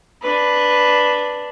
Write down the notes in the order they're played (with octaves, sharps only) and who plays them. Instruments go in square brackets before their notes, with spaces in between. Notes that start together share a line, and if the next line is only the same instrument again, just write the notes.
[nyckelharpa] D4 B4